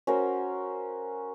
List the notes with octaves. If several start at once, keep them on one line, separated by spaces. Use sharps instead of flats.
C#4 F#4 A#4 C5